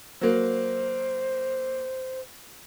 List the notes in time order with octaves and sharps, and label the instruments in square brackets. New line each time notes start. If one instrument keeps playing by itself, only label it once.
[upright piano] F#3 A#3 [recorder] C5